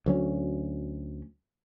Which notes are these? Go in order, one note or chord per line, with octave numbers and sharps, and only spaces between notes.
D2 F#3 C#4